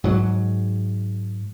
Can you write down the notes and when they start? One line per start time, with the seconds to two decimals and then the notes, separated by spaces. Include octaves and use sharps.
0.04 G#2 F#3